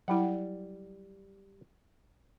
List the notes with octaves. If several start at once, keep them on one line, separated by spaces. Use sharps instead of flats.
F#3 G3 E4 F#5